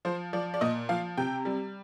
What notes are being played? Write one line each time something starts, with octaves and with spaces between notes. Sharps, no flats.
F3 C5
F3 D5
D5
A#2 D#5
F3 F5
C3 G5
G3